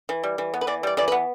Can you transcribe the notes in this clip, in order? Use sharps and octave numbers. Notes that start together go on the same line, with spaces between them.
E3
G3
E3
B3
B4
E3 D5
G3 D5
E3 D5
B4
B3